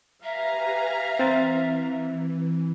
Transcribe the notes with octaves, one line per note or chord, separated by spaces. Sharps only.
G4 B4 E5 F5 G#5 A#5
E3 C4 A6